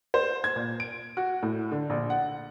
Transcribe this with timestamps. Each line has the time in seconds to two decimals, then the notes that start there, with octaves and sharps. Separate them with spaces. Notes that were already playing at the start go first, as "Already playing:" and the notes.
0.14 C5
0.44 G#6
0.56 A#2
0.80 D7
1.17 F#4
1.43 A2
1.72 D3
1.90 A#1
2.10 F#5